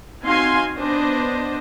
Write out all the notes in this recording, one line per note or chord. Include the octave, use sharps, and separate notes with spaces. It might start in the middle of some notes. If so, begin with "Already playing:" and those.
C4 D#4 F#4 F5 G#5 C6
B3 D4 C5 D#5